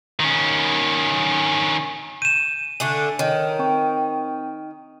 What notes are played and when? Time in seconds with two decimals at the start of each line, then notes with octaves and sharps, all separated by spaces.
0.20 D#3 C#4
2.22 G6 D#7 E7
2.80 D3 A3 D4 G#5
3.19 D#3 C#5
3.59 C4 G5 C#6